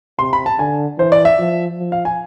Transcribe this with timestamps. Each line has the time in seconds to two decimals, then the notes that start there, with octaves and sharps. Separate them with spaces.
0.19 C3 C6
0.33 B5
0.46 A5
0.59 D3 G#5
0.98 E3 C5
1.12 D5
1.25 E5
1.39 F3
1.79 F3
1.92 F5
2.05 G#5